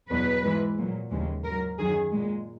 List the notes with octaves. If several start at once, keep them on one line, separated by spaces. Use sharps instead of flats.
E2 B2 F#3 B4
G#2 E3 G#3
A#2 F#3
D#2 C#3 E3 G#3
G#2 F#3 A#4
F#2 D#3 F#3 G#4
A#2 G#3